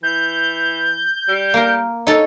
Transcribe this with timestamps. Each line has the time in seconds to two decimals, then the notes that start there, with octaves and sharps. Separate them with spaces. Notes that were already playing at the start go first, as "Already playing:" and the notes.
0.03 E3 G6
1.28 G3
1.54 A#3 A#4
2.07 D#4 A4 C#5